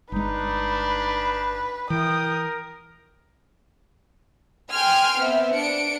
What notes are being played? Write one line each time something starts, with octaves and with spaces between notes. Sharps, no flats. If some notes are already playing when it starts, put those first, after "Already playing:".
G1 G#3 D4 D#4 B4
E3 A#4 G5 D#6
G5 G#5 C6 F6
B3 C4 E5
D4 C#7 D7